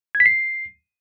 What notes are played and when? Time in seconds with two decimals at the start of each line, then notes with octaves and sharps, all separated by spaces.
0.15 G#6
0.20 B6
0.26 C7